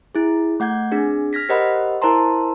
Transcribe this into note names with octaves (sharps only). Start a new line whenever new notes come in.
E4 G#4
A3 F#5 G6 G#6
C4 D4 G#4
F6 G#6 A#6 B6
G4 A#4 C5 D#5 F#5 B5
E4 A#4 C5 A5 A#5 C6